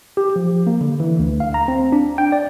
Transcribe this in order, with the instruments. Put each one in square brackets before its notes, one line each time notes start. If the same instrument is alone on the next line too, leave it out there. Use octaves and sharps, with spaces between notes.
[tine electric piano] G4
F3
A#3
D3
E3
D2
F5
A#5
C4
D4
G5
D5